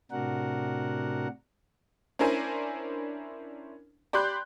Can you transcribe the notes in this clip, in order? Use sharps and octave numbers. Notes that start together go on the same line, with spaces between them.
A2 C3 D4 F#4 A#4 F#5
C#4 D4 E4 A#4 C5 G#5
G4 D5 B5 C6 F#6 G6